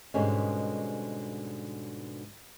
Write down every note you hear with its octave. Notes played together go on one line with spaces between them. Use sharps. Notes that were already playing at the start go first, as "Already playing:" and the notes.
G#2 B2 D3 G3 G#3 C#4